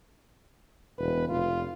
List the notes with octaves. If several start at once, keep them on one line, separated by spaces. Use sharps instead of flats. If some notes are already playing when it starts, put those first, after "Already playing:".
E1 B4
F1 F4